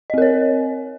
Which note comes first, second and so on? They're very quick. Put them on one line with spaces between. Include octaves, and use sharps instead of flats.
D#5 C4 A#4 C#5